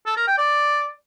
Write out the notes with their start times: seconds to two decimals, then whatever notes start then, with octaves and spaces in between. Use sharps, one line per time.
0.06 A4
0.17 A#4
0.27 G5
0.38 D5